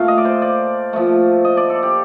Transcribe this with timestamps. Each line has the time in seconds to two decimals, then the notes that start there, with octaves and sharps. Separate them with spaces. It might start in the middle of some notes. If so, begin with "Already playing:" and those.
Already playing: A#2 A3 F5
0.08 D#5
0.18 D5
0.25 C5
0.42 D5
0.93 A#2 F3 A3
1.45 D#5
1.57 D5
1.70 A4
1.83 G4